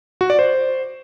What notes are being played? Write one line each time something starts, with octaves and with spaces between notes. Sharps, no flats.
F#4
D5
C5